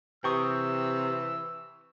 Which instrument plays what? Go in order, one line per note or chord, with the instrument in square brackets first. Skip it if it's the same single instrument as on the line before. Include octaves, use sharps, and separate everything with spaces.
[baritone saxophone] C3 [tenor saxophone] E3 [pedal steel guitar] G5 C#6 D#6 [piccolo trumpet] E6